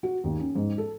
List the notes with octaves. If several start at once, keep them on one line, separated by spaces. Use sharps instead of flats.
F#4
D#2
C#4
G#2
A4